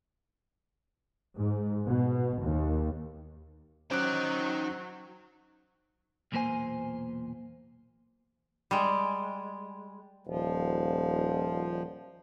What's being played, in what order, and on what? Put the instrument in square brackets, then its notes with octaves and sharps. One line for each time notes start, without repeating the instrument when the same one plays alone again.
[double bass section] G#2
B2
D#2
[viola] F#3 [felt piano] C#4 [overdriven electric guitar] D#4 G5 [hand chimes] C5 D6 F#6
[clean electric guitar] B1 E2 A#2 A#3 C5 G#5
[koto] G3 G#3
[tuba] D#1 [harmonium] F3